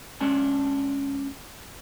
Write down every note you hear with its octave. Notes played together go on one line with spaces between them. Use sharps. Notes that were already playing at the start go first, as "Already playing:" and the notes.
G#3 C#4 D4 A5